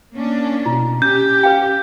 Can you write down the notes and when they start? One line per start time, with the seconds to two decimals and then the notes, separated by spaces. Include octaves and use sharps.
0.13 A#3 C#4 D4
0.66 B2 E4
1.02 C#4 G4 G6
1.43 B4 F5 G5